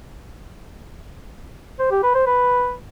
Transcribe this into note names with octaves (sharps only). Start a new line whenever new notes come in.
C5
G4
B4
C5
B4